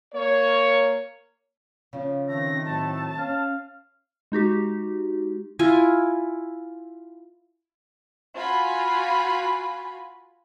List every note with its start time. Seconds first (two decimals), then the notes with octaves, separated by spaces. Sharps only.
0.14 A#3 C#5
1.93 C#3 F3
2.28 D#3 A3 C4 A#6
2.66 A2 F#3 A5
3.18 C#4 F5
4.32 G#3 D#4 F#4 G4
5.59 E4 F4 G#5
8.35 F4 F#4 G#5 B5